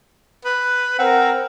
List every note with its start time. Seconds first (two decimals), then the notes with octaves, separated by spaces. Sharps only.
0.45 B4
0.99 C4 A#4 F#5